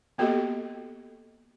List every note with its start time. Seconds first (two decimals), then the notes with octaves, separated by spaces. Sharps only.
0.18 A#3 B3 F#4 G4 A4 D#5